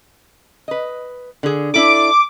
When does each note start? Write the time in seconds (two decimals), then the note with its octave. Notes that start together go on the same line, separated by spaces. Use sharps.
0.68 B4 D#5
1.43 D3 G#4
1.74 D4 E4 A4 D6